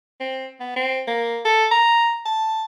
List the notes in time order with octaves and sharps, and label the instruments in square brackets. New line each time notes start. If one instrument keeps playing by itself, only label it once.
[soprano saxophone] C4
B3
C4
A#3
A4
A#5
A5